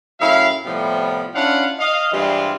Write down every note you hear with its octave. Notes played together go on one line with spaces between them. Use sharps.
F#2 A2 E4 F5
A2 C3 F3 G3 B3
C#4 D4 E4 F4 F5 F#5
D#5 F5
G2 E3 G3 G#3 C4 F4